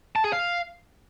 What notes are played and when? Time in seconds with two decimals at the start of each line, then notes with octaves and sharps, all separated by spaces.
0.16 A5
0.24 G#4
0.33 F5